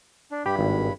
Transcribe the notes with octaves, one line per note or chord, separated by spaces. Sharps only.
D4
G2 G4 B5
G#1